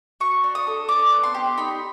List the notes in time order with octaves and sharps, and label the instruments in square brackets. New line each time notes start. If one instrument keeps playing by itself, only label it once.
[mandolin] F#4 C#6
D4
D#6
A4
D4 D6
B3
C6
G4
D#4 B5